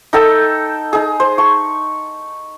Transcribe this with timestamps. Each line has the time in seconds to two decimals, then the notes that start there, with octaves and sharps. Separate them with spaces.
0.13 D#4 A4 G5 E6
0.93 D#4 G#4
1.20 C5
1.38 A5 C#6